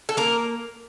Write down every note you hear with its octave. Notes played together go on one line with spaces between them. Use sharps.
A4
A#3 A#4